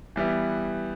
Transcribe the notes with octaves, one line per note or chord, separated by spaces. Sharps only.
E3 G3 B3 E4